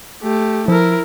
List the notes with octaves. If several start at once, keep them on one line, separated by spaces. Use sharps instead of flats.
A3 G4
F3 E4 A#4